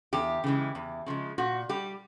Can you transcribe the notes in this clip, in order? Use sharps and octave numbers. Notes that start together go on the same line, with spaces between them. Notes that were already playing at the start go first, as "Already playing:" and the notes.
E2 G4
C#3 E3 G#3
E2
C#3 F3 G#3
A#2 F#4
G3 G4